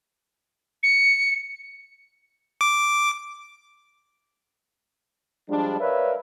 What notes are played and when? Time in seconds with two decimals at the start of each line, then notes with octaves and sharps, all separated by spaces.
0.83 C#7
2.61 D6
5.50 F3 G3 G#3 D4
5.80 A#4 B4 C#5 D5 E5 F5